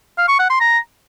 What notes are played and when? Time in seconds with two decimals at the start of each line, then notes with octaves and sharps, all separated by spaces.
0.18 F5
0.28 C#6
0.39 F#5
0.50 C6
0.60 A#5